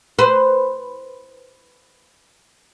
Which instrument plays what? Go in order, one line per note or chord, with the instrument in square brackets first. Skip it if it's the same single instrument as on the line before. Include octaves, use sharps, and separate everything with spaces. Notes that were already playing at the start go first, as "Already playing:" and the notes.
[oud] B4 C5